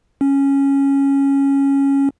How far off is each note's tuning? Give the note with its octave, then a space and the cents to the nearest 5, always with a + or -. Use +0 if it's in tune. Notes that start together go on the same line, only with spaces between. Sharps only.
C#4 -5